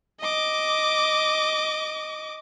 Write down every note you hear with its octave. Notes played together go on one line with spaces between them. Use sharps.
D#5 D6